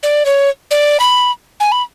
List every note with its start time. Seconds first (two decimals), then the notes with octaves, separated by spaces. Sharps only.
0.03 D5
0.26 C#5
0.71 D5
1.00 B5
1.60 G#5
1.72 B5